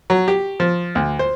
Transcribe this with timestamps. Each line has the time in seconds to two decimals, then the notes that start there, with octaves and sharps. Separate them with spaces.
0.10 F#3
0.28 G4
0.60 F3
0.95 D2
1.19 C5